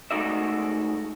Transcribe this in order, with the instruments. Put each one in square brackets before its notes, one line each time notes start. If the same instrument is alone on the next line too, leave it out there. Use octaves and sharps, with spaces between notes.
[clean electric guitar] G#3 A3 D#4 F#4 D5 E5